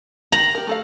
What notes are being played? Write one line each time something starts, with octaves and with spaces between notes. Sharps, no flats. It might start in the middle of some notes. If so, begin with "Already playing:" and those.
D#3 G4 A#5 F#7
G4 A#4
A3 A4 F5